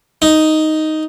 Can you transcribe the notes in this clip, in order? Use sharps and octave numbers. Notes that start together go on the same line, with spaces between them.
D#4